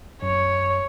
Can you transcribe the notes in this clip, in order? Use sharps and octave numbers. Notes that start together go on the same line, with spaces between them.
F#2 C#5